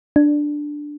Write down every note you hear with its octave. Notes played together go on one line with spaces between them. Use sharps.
D4